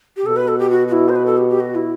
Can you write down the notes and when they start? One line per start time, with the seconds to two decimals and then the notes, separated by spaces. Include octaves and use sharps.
0.17 G4
0.26 B2 A4
0.36 B4
0.48 A4
0.59 G4
0.70 F#4
0.88 F#4
0.92 E4
1.09 C5
1.16 B4
1.26 A4
1.38 G4
1.49 G4
1.60 F#4
1.75 E4